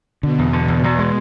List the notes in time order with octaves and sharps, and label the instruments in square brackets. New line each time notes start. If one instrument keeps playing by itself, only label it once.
[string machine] B2 [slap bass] D3
[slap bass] E2
D3
E2
E2
G#3